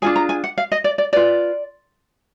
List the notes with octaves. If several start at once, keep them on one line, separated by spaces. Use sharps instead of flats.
D4 F4 G#4 G#5
A#5
G#5
F#5
F5
D#5
D5
D5
F4 B4 D5